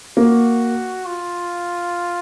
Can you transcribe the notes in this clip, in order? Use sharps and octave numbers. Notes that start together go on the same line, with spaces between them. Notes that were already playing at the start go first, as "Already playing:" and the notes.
A#3 F#4
F4